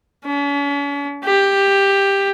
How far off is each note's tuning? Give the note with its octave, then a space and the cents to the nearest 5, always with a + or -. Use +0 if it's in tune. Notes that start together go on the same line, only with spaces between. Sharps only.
C#4 +45
G4 +10